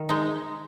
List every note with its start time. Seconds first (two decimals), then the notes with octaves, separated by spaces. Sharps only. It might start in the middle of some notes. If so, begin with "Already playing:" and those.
Already playing: D#3
0.09 G#3 D#4